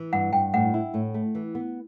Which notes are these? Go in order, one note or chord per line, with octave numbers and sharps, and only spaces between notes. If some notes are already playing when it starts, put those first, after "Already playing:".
Already playing: E3
G2 F#5
G2 G5
A2 F#5
E4
A2
A3
E3
B3